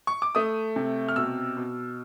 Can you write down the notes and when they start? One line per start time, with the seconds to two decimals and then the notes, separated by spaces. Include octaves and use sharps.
0.07 C#6
0.22 D6
0.35 A3 D#6
0.76 C3
1.09 F6
1.16 B2 E6
1.57 B2